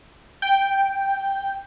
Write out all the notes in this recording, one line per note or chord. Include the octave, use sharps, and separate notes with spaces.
G5